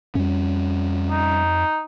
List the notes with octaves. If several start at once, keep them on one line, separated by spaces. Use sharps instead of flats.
F2 G3 C#4
D#4